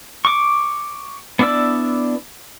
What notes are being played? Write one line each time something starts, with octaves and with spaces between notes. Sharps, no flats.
C#6 D6
B3 D4 E4 D5 E6